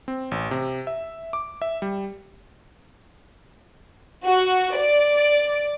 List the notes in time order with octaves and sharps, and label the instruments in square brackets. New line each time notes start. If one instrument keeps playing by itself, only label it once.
[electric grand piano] C4
A1
C3
E5
D6
E5
G3
[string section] F#4
D5